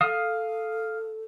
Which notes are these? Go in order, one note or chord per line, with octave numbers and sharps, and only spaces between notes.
A4 F5 D#6